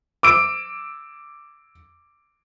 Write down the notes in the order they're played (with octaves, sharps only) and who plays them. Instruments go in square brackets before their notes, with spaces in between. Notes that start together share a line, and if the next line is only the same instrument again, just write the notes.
[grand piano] D6 E6 D7